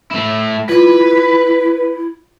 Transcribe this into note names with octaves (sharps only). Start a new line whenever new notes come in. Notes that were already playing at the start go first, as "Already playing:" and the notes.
A3 E4
E4 F4 B4